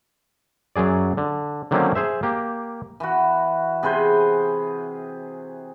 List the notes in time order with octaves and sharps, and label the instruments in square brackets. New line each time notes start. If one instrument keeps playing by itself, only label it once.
[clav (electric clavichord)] F#2 F#3 G#4 D5
D3
D3 D#3 F#3 A#3 C4 C#4
G#4 C5 E5
A#3 G4
[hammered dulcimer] E3 F#4
C3 G#4 B4 C5